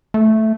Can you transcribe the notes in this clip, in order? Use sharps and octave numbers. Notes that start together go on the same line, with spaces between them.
A3